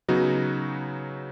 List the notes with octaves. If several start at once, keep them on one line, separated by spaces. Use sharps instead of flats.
C#3 F#3 B3 D#4 F#4